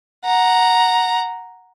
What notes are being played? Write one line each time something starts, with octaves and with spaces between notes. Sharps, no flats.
F#5 A#5